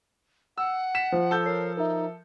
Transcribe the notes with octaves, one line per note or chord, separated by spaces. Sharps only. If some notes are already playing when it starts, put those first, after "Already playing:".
F#5 E6
B6 E7
F3 C5
A4 G6
A#4 C#5 C7
D#4 A#4 E5